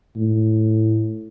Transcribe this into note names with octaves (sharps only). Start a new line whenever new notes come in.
A2